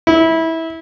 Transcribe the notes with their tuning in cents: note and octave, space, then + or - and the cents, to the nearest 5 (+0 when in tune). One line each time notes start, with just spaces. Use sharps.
E4 -20